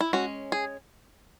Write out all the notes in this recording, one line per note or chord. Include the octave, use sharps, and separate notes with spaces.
E4
G#3 C#4 F#4
G#4